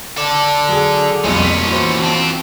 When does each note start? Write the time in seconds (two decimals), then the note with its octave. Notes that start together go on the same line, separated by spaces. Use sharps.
0.17 A4 D5
0.68 F#3 G#4
1.24 B1 F2 A#2 G3 C#4
1.44 B6
1.68 E3 F#4 C5
2.01 F2 C4